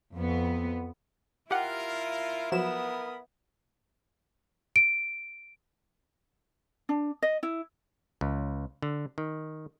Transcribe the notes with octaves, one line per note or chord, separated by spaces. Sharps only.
F2 B3
E4 F4 G4 A#4 F#5
F3 F#3 B3 A#4 B5 D#6 E7
D7
D4
D#5
E4
C#2
D3
D#3